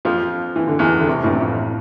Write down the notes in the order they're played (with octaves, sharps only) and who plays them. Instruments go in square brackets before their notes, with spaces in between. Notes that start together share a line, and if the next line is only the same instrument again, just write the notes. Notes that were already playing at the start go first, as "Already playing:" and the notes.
[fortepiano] F2 F3
E3
D3
E2 E3
D3
C2 C3
A1 A2
F2